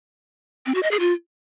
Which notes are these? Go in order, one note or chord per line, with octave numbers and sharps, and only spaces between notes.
C4
F#4
D#5
G#4
F4